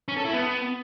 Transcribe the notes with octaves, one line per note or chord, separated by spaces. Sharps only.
C#4
A4
E4
B3